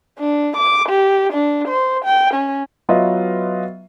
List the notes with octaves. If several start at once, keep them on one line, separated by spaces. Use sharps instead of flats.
D4
D6
G4
D4
C5
G5
C#4
F#3 B3 F4 B4 D#5 E5